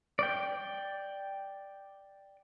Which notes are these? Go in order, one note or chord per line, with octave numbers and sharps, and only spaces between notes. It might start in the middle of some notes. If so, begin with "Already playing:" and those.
D5 G5